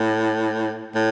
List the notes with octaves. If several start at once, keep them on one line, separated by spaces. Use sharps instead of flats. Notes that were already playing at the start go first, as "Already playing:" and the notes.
Already playing: A2
A2